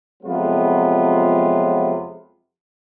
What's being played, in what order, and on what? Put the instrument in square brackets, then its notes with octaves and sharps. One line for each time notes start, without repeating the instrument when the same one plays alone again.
[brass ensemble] F2 C3 F#3 G#3 B3 F4